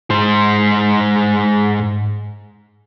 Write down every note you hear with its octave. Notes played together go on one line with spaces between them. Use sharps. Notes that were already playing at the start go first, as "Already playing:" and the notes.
G#2 C5